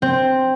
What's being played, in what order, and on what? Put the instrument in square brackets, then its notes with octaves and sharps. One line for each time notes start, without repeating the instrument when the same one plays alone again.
[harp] C4